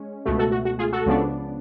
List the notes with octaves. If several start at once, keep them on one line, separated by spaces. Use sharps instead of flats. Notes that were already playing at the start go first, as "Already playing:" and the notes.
Already playing: G#3 C#4
C#2 B2 A3
F#4 A4
F#4
F#4
F4 G#4
F#4 A4
C#2 C#3 F3 B3 D4